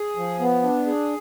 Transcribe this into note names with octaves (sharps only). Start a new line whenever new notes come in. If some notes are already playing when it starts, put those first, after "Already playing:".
Already playing: G#4
F3
B3
D4
G#4